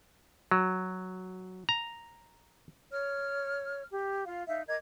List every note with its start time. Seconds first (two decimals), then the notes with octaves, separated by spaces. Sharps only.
0.51 F#3
1.69 A#5
2.91 C#5 F6
3.91 G4
4.26 F4 F5
4.47 D#4 E5 F5
4.67 A#4 D#5 D6 G#6